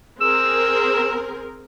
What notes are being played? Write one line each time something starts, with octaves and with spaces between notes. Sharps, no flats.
C4 G#4 A#4 E6